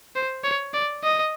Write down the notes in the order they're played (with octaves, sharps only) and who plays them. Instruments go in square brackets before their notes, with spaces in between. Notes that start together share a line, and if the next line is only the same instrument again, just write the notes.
[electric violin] C5
C#5
D5
D#5